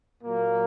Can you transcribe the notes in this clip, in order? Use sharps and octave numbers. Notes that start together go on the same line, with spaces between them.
A#2 F#3 A#3